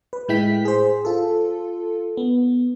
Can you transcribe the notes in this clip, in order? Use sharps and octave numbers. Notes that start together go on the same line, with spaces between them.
B4
A2 G#3 E4 G5 B6
G#4 C5
F4 A4
B3